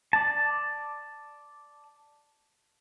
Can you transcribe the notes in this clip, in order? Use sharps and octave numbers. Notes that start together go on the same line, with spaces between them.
D5 A5